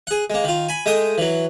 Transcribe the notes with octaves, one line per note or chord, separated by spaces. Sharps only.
G#4 F#5
G#3 A#3
D#3 F4
G#5 B5
G#3 A3 G5 D#6
E3 F#3